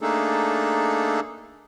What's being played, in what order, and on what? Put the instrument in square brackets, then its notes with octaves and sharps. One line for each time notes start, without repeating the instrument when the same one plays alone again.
[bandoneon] A3 A#3 D4 D#4 G#4 A4